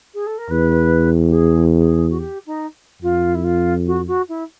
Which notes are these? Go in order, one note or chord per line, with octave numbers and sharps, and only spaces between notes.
G#4
A4
A#4
E2 B4
G4
G#4
G#4
F#4
G4
D#4
F2 F4
E4
F4
F#4
F#4
E4